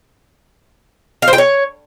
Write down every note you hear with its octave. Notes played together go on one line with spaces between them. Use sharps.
F5
C5
G5
C#5